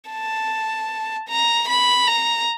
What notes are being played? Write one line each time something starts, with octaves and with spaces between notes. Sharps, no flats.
A5
A#5
B5
A#5